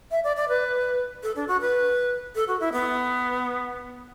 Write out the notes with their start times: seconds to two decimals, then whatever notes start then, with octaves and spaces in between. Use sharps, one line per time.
0.11 E5
0.24 D5
0.36 D5
0.49 B4
1.23 A4
1.36 D4
1.48 F#4
1.61 B4
2.35 A4
2.48 F#4
2.60 E4
2.73 B3